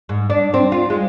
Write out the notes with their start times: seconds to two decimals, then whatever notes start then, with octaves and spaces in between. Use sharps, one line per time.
0.09 G#2
0.30 D4
0.54 C4
0.72 F4
0.90 G#3